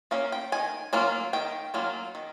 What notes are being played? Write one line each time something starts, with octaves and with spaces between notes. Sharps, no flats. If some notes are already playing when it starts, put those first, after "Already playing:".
A#3 C#4 F5
G5
D#3 G#5
F#3 A#3 C#4 F4
D#3 G5
F#3 A#3 C#4 F4
D#3